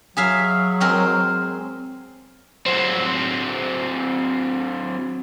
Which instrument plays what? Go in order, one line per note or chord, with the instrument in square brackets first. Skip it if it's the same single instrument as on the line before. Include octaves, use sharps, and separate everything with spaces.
[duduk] F#3 [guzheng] G#4 E5 F5
[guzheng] G#3 C4 A#4
[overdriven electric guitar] F#3 C4